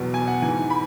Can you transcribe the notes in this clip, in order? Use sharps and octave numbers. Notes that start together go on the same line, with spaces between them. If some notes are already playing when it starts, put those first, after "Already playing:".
Already playing: E2 B2 F#3
G#5
F#5
G#2 E3 G#5
B5